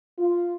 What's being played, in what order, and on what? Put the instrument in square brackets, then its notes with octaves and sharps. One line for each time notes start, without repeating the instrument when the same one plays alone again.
[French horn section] F4